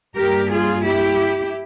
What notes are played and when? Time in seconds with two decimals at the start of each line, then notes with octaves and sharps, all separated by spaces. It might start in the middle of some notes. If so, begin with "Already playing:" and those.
0.16 G2 G3 A#3 G4 A#4
0.51 F4 G#4
0.85 E4 G4